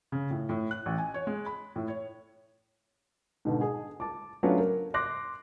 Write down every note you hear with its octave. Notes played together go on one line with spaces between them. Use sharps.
C#3
A2
A2
F#6
A1
G#5
C#5
G#3
B5
A2
C#5
G#2 B2 D3
G#4
A5 D6
F#3 A3 B3 C#4 D4 F4
A#4
C6 D6 F#6 A#6